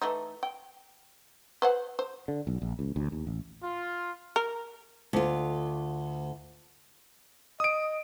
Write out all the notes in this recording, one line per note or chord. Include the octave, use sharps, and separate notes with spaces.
E3 A3 D#4
G5
B4 C5 F#5
C5
D3
B1
A#1
C#2
D2
D#2
A1
F4
A#4
D2 F4
D#5 D#6 D7